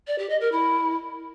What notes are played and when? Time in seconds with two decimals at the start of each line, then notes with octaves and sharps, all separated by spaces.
0.07 D5
0.18 G4
0.29 D#5
0.40 A#4
0.52 E4